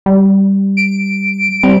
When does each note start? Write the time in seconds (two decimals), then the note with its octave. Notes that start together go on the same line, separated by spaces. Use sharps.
0.06 G3
0.77 D7
1.63 G3 C4